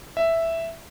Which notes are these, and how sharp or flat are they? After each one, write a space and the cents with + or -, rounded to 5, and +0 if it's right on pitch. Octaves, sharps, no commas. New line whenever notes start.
E5 +0